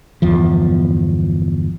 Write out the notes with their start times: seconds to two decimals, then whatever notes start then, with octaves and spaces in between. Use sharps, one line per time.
0.22 G1 E2 F3